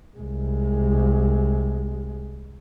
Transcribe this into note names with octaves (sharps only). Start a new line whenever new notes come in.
C2 G#3